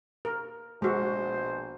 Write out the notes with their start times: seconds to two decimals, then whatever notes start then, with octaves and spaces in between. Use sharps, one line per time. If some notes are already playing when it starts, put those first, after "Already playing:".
0.25 A#4
0.82 A#1 B2 G#3 F#4 C5